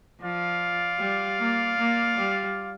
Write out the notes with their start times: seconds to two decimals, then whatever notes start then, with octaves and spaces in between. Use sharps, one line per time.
0.20 F3 F4 D5 F5
0.99 G3
1.39 A#3
1.78 A#3
2.18 G3